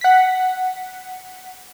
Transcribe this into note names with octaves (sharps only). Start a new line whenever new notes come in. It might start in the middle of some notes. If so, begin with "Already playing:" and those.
F#5 B6